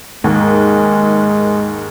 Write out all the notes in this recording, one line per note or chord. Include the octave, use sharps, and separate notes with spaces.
D#2 G#2 D#3 G#3